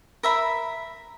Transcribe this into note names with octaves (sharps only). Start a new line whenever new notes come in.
A#4 E5 B5